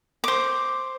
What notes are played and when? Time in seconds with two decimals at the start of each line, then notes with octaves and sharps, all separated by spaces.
0.24 C5 D6